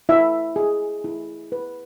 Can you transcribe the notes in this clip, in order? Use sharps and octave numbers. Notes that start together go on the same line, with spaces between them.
E4 E5
G#4
E4
B4